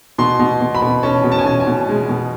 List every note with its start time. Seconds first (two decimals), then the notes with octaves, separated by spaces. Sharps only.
0.18 B2 C6
0.39 B2
0.61 B2
0.75 B5
0.82 B2
1.03 C#4 A5
1.24 B2
1.32 A5
1.39 G#5
1.45 C#4 A5
1.60 G#5
1.67 B2
1.89 G#3
2.09 B2